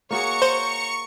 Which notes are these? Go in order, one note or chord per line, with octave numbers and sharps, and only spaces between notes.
A#3 F#4 G#4 C#5 A#5 C#6 C#7
C5